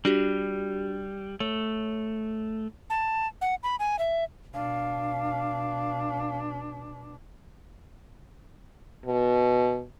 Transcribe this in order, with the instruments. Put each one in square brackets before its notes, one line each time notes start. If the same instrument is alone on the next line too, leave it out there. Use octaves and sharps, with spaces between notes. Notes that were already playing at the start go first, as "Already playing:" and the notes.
[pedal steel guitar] G3 [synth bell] D4 F#4 G4
[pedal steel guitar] A3 [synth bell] C#5
[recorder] A5
F#5
B5
G#5
E5
[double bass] B2 D4 [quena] F5
[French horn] B2